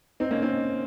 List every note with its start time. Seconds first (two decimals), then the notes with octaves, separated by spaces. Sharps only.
0.20 C4 D#4
0.31 A#3 C#4
0.42 C4 D#4